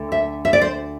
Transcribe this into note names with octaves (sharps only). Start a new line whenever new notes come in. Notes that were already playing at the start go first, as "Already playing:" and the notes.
Already playing: D2 D3 A3
E5
E5
D5
C5